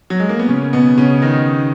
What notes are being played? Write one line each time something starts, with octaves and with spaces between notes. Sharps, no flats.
F#3
G#3
A#3
B3
C#3 C#4
B2 B3
C#3 C#4
D#3 D#4